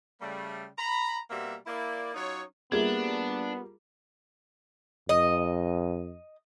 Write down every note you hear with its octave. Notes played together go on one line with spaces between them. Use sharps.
C#3 G3 A3
A#5 B5
B2 G3 A#3 C4 F#4 E5
A#3 E4 D5
F#3 C#4 D#4 F4 C#5
G3 A#3 B3 D4 F4 G#4 E5
F2 D#5